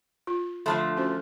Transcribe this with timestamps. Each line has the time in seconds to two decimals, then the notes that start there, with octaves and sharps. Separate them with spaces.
0.27 F4
0.66 D3 F3 A3 A5 B5 C6
0.97 C#4 F#4 C5